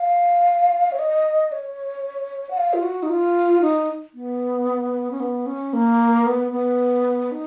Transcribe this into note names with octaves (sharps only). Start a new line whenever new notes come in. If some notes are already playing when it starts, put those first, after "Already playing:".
Already playing: F5
C#5
D#5
C#5
F#5
F5
F4
F#4
D#4
F4
D#4
B3
C#4
B3
C#4
A#3
B3
B3
D#4